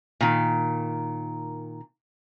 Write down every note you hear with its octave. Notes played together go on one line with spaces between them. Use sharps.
A#2 D#3